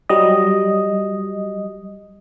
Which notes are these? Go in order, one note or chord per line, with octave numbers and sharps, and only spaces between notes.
F#3 G3 D#5